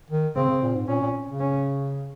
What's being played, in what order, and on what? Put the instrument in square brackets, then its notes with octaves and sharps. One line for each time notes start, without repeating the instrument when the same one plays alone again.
[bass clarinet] D#3
[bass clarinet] C#3 [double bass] C4
[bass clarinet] C#3
A#2
G#2
[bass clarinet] A#2 [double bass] C#4
[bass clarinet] A#2
C#3
[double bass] C#4